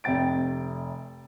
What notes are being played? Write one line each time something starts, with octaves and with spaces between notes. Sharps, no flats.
F1 C3 G5 A6 D7